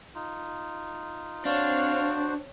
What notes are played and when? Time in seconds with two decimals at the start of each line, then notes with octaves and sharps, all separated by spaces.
0.15 D#4 F4
1.45 C4 D4 F#4 C5 C#5 F5